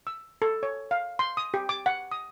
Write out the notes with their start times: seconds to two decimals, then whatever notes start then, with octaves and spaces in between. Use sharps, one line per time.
0.07 E6
0.42 A4
0.63 C#5
0.91 F5
1.19 C6
1.37 D#6
1.54 G4
1.69 D6
1.86 F#5
2.12 D#6